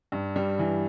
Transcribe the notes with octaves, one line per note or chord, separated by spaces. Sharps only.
G2
G3
E3